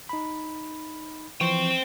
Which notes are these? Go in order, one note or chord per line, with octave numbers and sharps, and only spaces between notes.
D#4 B5
E3 F3 C5 G5 C#6